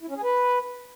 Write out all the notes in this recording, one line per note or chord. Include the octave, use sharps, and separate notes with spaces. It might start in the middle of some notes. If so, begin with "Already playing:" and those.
E4
C#4
G#4
B4